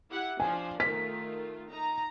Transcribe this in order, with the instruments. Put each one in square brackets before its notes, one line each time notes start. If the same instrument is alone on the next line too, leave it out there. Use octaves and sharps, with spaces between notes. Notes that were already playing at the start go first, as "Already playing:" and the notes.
[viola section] E4 G4 F#5
[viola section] F3 D4 C5 [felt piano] G#5
[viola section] D#3 A3 F4 [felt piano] B6
[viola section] D#4 A#5